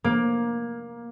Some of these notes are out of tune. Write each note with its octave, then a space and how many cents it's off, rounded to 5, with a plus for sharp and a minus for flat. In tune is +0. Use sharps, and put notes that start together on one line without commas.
A#3 +15